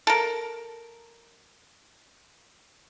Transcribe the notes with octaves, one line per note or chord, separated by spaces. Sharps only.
A4 A#4